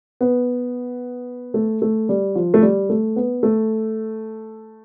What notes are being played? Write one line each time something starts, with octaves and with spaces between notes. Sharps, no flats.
B3
A3
A3
G3
F3
A3
G3
A3
B3
A3